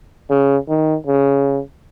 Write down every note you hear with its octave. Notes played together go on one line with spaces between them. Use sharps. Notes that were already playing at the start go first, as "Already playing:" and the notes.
C#3
D#3
C#3